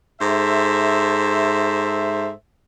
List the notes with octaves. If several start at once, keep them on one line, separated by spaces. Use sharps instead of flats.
G#2 A4 C5 E5